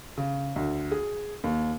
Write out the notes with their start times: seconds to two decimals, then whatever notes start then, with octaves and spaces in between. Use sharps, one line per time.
0.17 C#3
0.56 D2
0.91 G#4
1.44 D#2